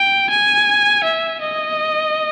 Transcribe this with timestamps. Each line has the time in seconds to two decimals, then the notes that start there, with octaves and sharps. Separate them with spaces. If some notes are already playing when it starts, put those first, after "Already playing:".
Already playing: G5
0.30 G#5
1.04 E5
1.41 D#5